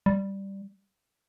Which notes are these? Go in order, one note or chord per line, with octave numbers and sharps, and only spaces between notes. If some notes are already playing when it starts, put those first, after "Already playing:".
G3